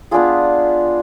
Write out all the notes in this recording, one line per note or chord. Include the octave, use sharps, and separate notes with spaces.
B3 D4 F4 G#4